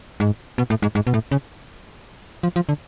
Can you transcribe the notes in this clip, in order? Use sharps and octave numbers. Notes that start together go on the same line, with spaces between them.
G#2
B2
A2
G#2
G#2
B2
A2
C#3
F3
F3
D3